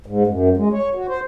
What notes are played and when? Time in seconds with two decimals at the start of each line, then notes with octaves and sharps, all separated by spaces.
0.06 G#2
0.27 F#2
0.57 G#3
0.73 C#5
0.95 F#4
1.08 C5